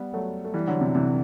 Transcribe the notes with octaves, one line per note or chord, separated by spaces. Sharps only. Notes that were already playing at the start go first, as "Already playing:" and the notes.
Already playing: G3 B3
F#3 A3
A3
E3 G3
D3 F#3
C3 E3
C3 E3